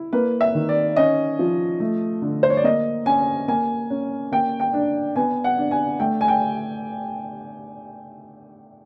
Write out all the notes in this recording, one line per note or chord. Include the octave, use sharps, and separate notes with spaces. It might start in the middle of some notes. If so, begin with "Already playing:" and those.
Already playing: E4
A#3 B4
E5
D#3
D5
C#4 D#5
F3
A3
D3
C5
C#5
D5
A#3 D#5
C#4 G#5
A#3 G#5
C#4
A#3 G5
G5
D4
B3 G#5
F#5
D4
G#5
A3 G5
G#5
G5